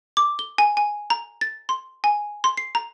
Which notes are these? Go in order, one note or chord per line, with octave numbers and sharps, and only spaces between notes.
D6
G7
G#5
G#5
A#5
A6
C6
G#5
C6
C7
A#5